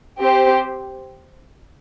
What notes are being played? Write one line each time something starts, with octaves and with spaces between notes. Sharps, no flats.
C4 G4 C5